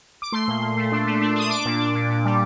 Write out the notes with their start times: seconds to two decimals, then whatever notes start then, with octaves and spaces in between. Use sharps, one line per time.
0.22 D6
0.32 A3 C6
0.48 A#2
0.62 A#2
0.77 A3
0.92 D4
1.07 A3
1.21 D4
1.36 D4 D#6
1.50 D4 D6
1.65 A#2
1.80 D4
1.95 A#2
2.09 A#2
2.25 G3